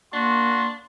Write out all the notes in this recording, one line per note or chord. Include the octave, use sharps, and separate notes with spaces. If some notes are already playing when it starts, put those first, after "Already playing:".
A#3 D4 F#4 C6